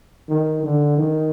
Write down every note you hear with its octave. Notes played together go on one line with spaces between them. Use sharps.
D#3
D3
D#3